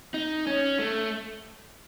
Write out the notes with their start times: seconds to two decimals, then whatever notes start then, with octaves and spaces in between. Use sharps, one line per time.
0.14 D#4
0.47 C#4
0.79 A3